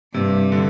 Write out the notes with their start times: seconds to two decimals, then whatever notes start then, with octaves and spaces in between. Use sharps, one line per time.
0.14 G2 C3
0.52 D3